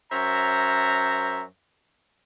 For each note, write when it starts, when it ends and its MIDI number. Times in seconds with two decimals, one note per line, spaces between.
0.12 1.44 42
0.12 1.44 72
0.12 1.44 73
0.12 1.44 76
0.12 1.44 82